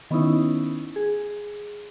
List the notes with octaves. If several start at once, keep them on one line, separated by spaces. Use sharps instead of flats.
D#3 B3 C#4 D#4 E4
G#4